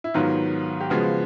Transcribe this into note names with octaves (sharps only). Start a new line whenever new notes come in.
E4
G#2 D#3 F#3 B3 F4
G4
C#3 F3 G#3 B3 F#4